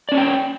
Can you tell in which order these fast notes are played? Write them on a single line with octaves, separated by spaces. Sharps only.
D5 C#4 C#5 G5